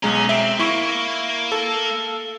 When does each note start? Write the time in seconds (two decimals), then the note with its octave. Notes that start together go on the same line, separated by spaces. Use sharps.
0.03 B1 G#3 C#4 A#5
0.29 C4 E5
0.59 A#3 E4 C#6
1.52 A4